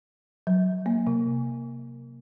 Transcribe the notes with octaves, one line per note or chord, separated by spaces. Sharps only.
F#3
A#3
C3